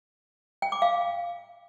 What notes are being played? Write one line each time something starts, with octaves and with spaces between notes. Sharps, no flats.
G5
D6
F5